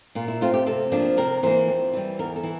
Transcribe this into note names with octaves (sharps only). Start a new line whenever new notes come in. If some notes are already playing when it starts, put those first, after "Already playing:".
A#2 F4
E4
A3 C4 F4
G4
C3 A4
F3 A#3 D4
C3 A#4
E3 A#3 C5
F2
E3 G3
E2 A#4
A4
E3